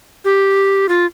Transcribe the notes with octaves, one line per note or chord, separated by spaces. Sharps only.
G4
F4